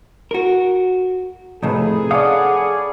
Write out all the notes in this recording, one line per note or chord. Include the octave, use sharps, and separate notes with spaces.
F#4 A#4
F2 A2 C3 D#4 G#4 A4 B4
C#4 A4 D5 F5 F#5 D#6